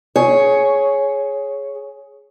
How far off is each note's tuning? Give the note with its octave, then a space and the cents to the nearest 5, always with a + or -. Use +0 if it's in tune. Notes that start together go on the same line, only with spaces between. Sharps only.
G#4 +10 C#5 +0